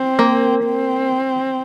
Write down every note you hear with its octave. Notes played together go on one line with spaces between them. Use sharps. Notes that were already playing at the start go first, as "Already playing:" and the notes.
Already playing: C4
A#3
C4